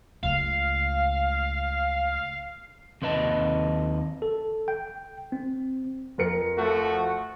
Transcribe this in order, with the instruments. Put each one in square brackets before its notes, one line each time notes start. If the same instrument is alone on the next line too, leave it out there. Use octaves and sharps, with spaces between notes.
[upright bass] C#2 A3 [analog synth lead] F5
[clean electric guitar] D#2 C4 B4 D#5 A5
[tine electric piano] A4
G5
C4
[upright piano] F2 A#4 C#7
[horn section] F3 A3 F#4